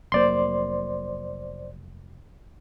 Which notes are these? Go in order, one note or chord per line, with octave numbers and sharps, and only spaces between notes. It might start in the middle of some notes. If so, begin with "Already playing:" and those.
F1 F#3 A#3 C5 D5 C6